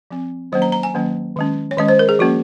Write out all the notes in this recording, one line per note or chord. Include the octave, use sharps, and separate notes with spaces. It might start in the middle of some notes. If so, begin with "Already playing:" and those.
F3 C4
D#3 F#3 A#3 C#4 C5
A#5
A#5
G#5
D#3 F#3 A#3 C#4
D#3 G#3 C#4
C#5
D#3 G#3 C#4 D#5
C5
A#4
G#4
F3 A#3 C#4 F#4